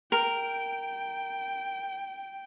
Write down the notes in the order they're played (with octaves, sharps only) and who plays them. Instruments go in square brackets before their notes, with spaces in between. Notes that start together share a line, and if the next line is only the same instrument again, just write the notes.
[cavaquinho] A#4 [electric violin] G5